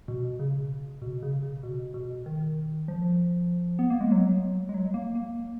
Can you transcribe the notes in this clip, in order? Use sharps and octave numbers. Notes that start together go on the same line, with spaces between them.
B2
C#3
B2
C#3
C#3
B2
B2
D#3
F3
B3
A#3
G#3
F#3
G#3
F#3
A#3
A#3